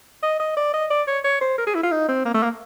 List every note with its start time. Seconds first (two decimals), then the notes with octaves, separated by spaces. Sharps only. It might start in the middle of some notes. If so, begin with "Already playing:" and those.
0.23 D#5
0.40 D#5
0.57 D5
0.74 D#5
0.91 D5
1.07 C#5
1.24 C#5
1.41 C5
1.58 A#4
1.67 G#4
1.75 E4
1.83 F4
1.92 D#4
2.09 C4
2.25 A#3
2.34 A3
2.43 A#3